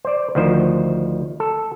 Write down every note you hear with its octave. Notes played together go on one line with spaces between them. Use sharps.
C5 D5
D2 D#3 F3 C5
A4